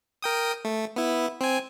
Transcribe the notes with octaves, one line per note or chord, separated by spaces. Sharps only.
A#4 G5 D#6
A3
B3 E4
C4 G#5